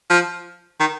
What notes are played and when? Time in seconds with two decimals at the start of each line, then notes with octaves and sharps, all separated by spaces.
0.10 F3
0.80 D#3